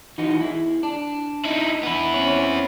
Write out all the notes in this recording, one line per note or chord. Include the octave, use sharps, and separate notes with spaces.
E3 D#4 F#4
E4 G#4
D4
D#4 E4
B3 E4
C4 C#4 C#5